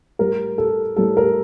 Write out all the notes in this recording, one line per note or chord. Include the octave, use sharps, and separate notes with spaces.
A2 G3 A#4
A4
A2 G3 A4
A#4